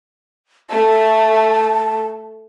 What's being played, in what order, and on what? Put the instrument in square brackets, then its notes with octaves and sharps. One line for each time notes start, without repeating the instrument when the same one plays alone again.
[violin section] A3 [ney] A5